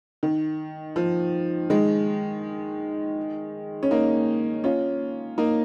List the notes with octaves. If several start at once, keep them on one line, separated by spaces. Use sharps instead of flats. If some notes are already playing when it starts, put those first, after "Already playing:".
D#3
F3
D#3 G#3
C#4
A#3 D#4
C#4 F4
A#3 D#4